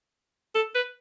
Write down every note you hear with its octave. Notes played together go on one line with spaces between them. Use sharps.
A4
B4